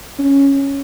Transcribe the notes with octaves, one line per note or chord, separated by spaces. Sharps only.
C#4